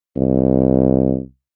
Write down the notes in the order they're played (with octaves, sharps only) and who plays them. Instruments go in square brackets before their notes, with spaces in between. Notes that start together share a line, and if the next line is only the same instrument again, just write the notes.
[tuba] C2